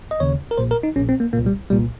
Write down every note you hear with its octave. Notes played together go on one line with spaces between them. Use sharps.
D#5
D#2 C#3 C#5
A#4
A#1 A#2 C5
A#4
D#4
A#1 A#2 C#4
C4
A#3
C2 A#2 A#3
G3
C2 A#2 G3